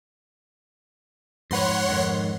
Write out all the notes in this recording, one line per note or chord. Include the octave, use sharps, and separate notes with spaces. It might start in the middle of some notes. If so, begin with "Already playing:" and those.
F2 G#2 B4 C#5 F#5 C6
F2 G#2 D#3